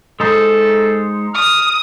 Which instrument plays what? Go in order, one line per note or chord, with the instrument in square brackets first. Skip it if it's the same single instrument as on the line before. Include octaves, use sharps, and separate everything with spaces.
[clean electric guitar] G#3 D#4 C5 [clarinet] A4
[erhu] D#6 [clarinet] F6